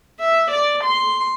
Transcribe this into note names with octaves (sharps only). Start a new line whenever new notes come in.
E5
D5
C6